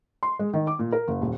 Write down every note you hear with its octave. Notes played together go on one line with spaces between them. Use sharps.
C6
G#3
D#3
D6
A#2
A#4
F#1
D#1